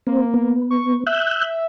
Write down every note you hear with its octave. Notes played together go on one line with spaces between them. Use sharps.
A#3 C4
B3
C#6
E5 E6 F#6 G6